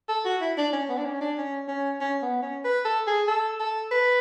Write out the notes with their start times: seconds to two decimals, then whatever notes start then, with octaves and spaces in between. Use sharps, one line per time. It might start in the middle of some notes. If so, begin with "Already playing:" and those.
0.09 A4
0.25 F#4
0.41 E4
0.58 D4
0.73 C#4
0.89 B3
0.98 D4
1.06 C#4
1.21 D4
1.37 C#4
1.68 C#4
2.01 C#4
2.22 B3
2.42 C#4
2.64 B4
2.85 A4
3.07 G#4
3.28 A4
3.60 A4
3.91 B4